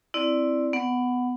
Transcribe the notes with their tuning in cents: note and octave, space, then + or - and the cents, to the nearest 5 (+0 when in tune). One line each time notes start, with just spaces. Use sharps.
C4 +0 E4 +0 D5 +0
B3 +15 F#5 +0